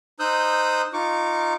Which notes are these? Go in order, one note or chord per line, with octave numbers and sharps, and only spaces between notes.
D#4 C5 D#6 E6 F#6 G6
D#4 F4 C#6 D6